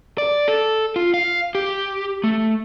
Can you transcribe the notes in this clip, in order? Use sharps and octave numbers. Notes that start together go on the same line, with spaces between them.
D5
A4
F4
F5
G4
A3